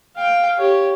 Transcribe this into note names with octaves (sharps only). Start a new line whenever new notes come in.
F5 G5
G4 C#5